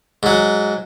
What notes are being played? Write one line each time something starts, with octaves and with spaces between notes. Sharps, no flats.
G#2 F#3